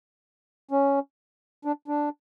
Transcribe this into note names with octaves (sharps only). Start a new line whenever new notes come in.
C#4
D4
D4